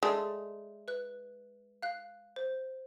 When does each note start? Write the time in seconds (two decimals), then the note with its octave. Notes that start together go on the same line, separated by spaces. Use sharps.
0.03 G#3 A3 D5
0.88 B4 F#6
1.82 F5 F#6
2.36 C5